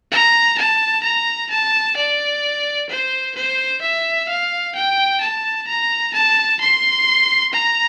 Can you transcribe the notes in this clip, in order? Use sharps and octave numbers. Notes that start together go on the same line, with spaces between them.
A#5
A5
A#5
A5
D5
C5
C5
E5
F5
G5
A5
A#5
A5
C6
A#5